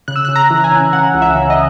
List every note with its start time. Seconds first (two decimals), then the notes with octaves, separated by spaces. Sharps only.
0.08 C#3 F#6
0.16 E6
0.25 F#6
0.29 C#3
0.36 A#5
0.50 E3
0.64 G#5
0.71 C#3
0.93 C#3 F#5
1.14 C#2
1.22 E5
1.36 C#3
1.50 D#5